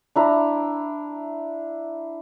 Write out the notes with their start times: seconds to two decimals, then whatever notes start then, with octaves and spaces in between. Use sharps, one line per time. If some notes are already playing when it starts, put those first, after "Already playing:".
0.15 D4 E4 A#5